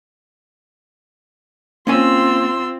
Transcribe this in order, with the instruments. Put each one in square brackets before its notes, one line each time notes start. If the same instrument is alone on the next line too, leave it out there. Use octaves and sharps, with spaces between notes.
[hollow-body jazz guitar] A#3 C#4 G#5 [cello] C4 F4 [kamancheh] C6 E6